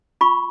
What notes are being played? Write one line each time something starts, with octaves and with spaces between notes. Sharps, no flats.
F4 B5 C#6